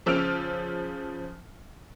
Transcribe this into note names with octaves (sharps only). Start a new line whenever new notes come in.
C#3 F3 E6 F6 D7 F7